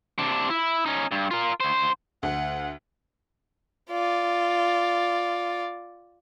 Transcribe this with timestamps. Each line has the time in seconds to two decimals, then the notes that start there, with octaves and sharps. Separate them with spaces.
0.18 C3 D4
0.50 E4
0.86 C#4 D#4
1.11 G2
1.31 F4 A#4
1.60 D2 C5
2.23 D2 F#5
3.90 F4 D5